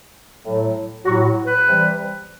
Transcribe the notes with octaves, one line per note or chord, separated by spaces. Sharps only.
A2 F#3
A2 F#3 F#4
B4
C3 E3 G3